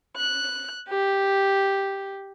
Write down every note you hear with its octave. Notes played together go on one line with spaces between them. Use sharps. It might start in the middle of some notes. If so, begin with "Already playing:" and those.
F#6
G4